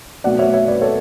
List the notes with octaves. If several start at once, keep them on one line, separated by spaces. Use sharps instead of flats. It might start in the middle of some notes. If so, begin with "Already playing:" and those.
B2 F#3 A3 D5 F#5
C#5 E5
C#5 E5
B4 D5
A4 C#5